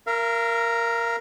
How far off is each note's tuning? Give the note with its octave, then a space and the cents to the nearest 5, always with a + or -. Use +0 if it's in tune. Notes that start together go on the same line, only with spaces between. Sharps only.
A#4 +0 F5 -40